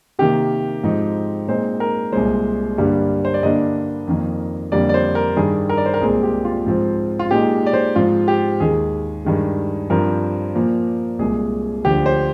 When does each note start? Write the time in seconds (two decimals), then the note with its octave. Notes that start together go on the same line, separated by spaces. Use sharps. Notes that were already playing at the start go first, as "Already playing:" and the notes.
0.19 C3 D#3 A#3 G4
0.84 G#2 F3 C4 D#4
1.48 A#2 G#3 C4 D#4 C5
1.80 A#4
2.13 C2 A#2 G#3 C5
2.77 G2 D3 G3 A#3
3.25 C5
3.34 D5
3.43 G2 D3 G3 A#3 D4 D#5
4.07 F2 D#3 A#3
4.72 F2 D3 G3 A#3 D5
4.89 D5
4.94 C5
5.15 A#4
5.36 G2 D#3 G3 G#4
5.69 A#4
5.78 D5
5.86 C5
5.94 A#4
6.01 C2 A#2 G#3 C4 G#4
6.23 G4
6.45 F4
6.66 G#2 F3 C4
7.19 F4
7.31 A#2 G#3 D#4 G4
7.66 D5
7.74 C5
7.95 G#2 F3 C4 F4
8.28 G4
8.60 D#2 D#3 G#3 G#4
9.25 G2 D#3 G#3
9.90 G2 F3 C4 A#4
10.55 A#2 F3 A#3
11.19 C2 A#2 G#3 G#4
11.84 D2 D3 F3 G4
12.06 C5